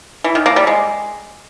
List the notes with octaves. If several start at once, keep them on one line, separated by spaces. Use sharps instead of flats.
E3
D#3
A#3
G3
G#3